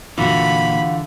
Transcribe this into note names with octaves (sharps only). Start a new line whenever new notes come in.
A#2 D3 E3 F4 F#4 B5